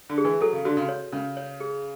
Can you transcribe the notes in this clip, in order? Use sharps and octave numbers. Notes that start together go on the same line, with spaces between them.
D3
G#4
E3
F#3 A4
C#3
D3 F#4
C#3
C#5
C#3 C#4
C#5
G#4